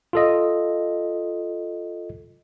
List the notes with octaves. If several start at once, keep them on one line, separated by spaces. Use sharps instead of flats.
F4 A4 D#5